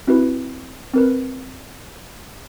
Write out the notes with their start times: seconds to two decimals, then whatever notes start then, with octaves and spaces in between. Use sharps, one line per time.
0.07 C4 E4 F#4 G4 B4
0.94 C4 A#4 B4